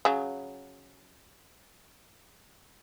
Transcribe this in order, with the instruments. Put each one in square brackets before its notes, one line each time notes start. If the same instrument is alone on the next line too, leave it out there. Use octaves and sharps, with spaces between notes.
[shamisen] C#3 F#3